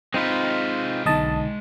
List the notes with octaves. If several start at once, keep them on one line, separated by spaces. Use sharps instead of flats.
G#3 C4 D#4 F4 B4
B1 B2 D3 D#4 D#5 A5